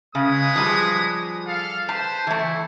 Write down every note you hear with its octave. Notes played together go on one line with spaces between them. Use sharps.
C#3 G#3 B4 D#6
F3 G3 G#4
A4 F5
B4 C5 A5
E3 A3 E4